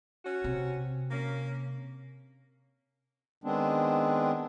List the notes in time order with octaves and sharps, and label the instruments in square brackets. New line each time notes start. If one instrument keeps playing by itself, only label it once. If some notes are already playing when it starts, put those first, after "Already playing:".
[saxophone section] C#4 F#4
[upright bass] C3
[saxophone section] A#3 C#4
[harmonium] D#3 G#3 B3 C4 D4